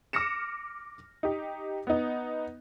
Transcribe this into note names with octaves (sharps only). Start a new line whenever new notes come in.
D6 F6 A#6 C#7 E7
D#4 G4
B3 D#4